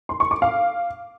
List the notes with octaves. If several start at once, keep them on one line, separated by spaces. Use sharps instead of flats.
C6
C#6
D6
F5